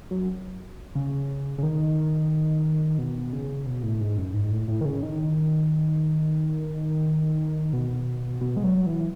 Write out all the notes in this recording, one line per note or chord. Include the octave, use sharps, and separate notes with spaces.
F#2
C#3
C#3
D#3
B2
C#3
B2
A2
G#2
F#2
G#2
A2
A2
D#3
C#3
D#3
B2
B2
G#3
F#3
E3